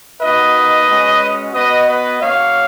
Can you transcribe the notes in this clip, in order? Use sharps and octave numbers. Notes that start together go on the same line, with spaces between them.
A#3 D#4 F#4 B4 D#5
G#3 C#4 F#4
B3 F#4 B4 D#5
B4 D#5
A#3 C#4 F#4 C#5 F5